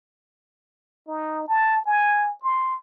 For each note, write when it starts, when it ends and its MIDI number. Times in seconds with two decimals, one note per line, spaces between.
1.07 1.47 63
1.48 1.83 81
1.85 2.34 80
2.42 2.75 84